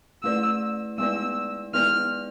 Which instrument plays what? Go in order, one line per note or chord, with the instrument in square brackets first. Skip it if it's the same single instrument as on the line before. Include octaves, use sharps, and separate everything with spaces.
[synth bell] A3 E4 B4 D5 [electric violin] E6
[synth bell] G#3 B3 E4 B4 D5 [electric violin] E6
[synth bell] G#3 B3 E4 B4 D5 [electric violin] F6